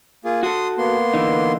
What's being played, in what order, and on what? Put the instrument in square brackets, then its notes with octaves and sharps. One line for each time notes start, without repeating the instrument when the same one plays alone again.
[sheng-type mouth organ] A#3 F4 G#4
[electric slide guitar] F#4 A4 [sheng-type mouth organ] C6 D#6
[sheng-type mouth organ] A#3 B3 C6
[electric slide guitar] D3 E3 D#4